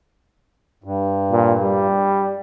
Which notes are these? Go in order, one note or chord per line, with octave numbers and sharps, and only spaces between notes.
G2
A#2
G3